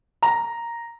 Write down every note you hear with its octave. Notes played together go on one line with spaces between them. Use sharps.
A#5